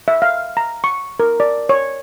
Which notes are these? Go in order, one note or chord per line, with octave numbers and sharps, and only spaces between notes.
E5
F5
A#5
C#6
A#4
D5
C#5